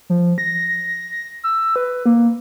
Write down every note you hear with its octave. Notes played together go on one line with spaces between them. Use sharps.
F3
A#6
E6
B4
A#3